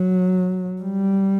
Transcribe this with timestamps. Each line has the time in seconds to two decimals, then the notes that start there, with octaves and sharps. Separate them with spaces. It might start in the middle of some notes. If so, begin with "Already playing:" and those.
Already playing: F#3
0.82 G3